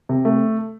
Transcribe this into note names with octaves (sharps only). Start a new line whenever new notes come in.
C3
A3